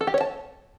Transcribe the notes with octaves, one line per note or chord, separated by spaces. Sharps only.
A4
G4
C#5
A5